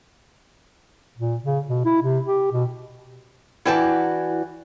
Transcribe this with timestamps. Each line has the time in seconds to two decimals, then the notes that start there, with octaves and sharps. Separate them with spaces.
1.17 A#2
1.44 C#3
1.69 B2
1.85 E4
2.03 C3
2.27 G4
2.52 B2
3.65 E3 E4 F#4 D5 G5 A5